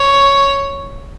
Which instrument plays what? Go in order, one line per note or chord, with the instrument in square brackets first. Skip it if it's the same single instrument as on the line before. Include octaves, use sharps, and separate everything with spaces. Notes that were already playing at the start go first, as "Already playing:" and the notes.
Already playing: [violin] C#5